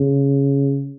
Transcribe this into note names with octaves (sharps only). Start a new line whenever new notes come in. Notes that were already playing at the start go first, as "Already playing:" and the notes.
Already playing: C#3